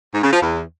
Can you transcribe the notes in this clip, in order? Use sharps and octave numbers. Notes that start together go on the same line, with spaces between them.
G#2
C#3
F3
E2